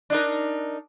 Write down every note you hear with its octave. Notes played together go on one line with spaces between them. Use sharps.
D4 D#4 A#4